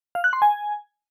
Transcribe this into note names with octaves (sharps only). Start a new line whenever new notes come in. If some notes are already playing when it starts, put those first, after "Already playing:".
F5
F#6
C6
G#5